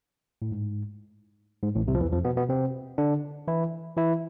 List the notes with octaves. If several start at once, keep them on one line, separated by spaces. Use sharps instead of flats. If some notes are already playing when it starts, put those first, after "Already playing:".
A2
G#2
G#2
A1 A2
C2 C3
F3
E2 E3
F2 F3
B2 B3
B2 B3
C3 C4
D3 D4
E3 E4
E3 E4